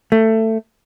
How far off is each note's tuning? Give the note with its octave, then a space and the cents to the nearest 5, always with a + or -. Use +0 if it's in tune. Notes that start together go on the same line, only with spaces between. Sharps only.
A3 +15